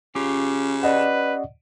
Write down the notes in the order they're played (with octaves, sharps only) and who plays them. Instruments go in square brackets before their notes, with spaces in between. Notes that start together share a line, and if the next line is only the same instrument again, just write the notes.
[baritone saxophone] C#3 [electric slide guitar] C#4 F4 G4
[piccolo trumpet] B4 [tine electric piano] D5 D#5 F#5